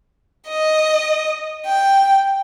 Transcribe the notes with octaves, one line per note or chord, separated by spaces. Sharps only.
D#5
G5